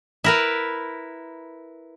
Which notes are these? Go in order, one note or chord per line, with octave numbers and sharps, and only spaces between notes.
E4 A#4 B4